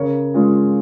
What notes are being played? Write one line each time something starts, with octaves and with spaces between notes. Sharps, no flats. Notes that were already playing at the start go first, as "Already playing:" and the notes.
Already playing: C#3 A#4 C#5
G#3 C#4 F4